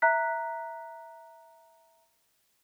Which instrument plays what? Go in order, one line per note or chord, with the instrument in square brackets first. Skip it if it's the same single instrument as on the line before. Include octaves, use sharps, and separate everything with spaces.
[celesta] E5 A#5 F#6 B6